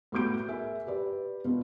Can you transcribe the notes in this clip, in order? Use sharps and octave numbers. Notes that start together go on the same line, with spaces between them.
A2 B3 F#4 D6 G6 D7
G#4 A#4 E5 G#5
G4 B4 D5
B2 F4 B4